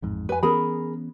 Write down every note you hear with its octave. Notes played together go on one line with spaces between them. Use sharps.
A1 F2 G#2
F2 B4 G#5
E3 B3 C#4 G#4 A#4 B5